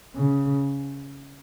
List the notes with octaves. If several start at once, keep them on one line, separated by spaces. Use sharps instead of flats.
C#3